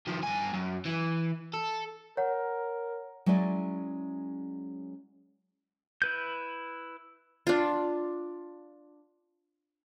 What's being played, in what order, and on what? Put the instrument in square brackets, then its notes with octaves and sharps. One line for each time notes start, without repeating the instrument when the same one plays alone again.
[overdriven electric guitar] D#3 F3
G2 G#5
F#2
E3
A4
[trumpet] A#4 [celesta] C#5 F#5
[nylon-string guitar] F#3 G#3 C#4 E4 D5 E5
[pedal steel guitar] E4 B4 G6
[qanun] D4 F4